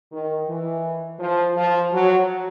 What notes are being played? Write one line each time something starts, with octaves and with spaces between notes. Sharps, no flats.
D#3
E3
F3
F3
F#3